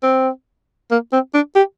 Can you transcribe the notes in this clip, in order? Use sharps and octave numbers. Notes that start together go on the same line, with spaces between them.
C4
A#3
C4
D4
G4